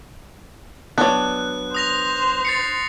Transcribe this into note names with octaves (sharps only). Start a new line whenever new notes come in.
F#3 B3 D4 F#6
C5 D#6 A#6 F7
A6 C7 C#7